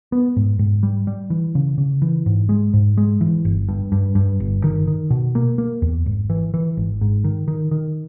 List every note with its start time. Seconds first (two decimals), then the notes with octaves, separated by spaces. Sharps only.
0.12 B3
0.36 G#2
0.59 G#2
0.83 G3
1.07 G3
1.30 E3
1.55 C#3
1.78 C#3
2.02 E3
2.26 G#2
2.49 G#3
2.74 G#2
2.97 G#3
3.21 E3
3.45 G1
3.69 G2
3.92 G2
4.15 G2
4.40 G1
4.64 D#3
4.87 D#3
5.10 B2
5.35 A#3
5.58 A#3
5.82 E2
6.06 G#1
6.30 E3
6.54 E3
6.77 G#1
7.01 G#2
7.24 D#3
7.48 D#3
7.71 D#3